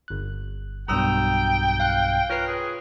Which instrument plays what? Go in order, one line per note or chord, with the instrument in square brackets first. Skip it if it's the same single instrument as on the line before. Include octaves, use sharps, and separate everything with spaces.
[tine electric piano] G1 F#6
[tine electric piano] B1 G2 B2 [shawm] G5 [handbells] A#5 D#6 E6
[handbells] F5 F#6 G6
[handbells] F4 B4 [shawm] A#4 [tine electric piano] C#5 F#6 C7
[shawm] G#4